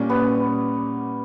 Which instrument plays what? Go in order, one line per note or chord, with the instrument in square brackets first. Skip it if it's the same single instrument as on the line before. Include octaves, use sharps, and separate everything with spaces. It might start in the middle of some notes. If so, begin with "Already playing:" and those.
Already playing: [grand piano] A#2 G3 A#3 C#4
[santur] B3